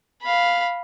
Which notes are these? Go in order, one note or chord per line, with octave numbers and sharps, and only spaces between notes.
F5 B5